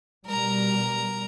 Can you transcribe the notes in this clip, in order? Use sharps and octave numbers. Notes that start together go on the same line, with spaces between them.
B2 G3 A#4 A#5